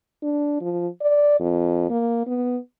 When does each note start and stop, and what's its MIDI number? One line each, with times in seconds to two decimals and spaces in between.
0.23 0.57 62
0.61 0.88 53
1.01 1.35 74
1.40 1.90 41
1.90 2.25 58
2.27 2.58 59